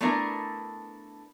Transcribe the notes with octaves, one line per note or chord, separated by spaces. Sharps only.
A3 B3 D4 E4 A#4